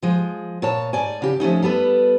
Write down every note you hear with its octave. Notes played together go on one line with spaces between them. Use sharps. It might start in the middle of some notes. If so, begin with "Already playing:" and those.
F3 G#3
A#2 C#5 A5
G#2 D5 G#5
C#3 G4
F3 A3 C#4 D#4
G3 B3 A4 B4